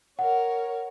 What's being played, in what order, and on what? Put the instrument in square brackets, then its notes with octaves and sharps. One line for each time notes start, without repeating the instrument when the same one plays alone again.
[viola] A#4 C#5 [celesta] F#5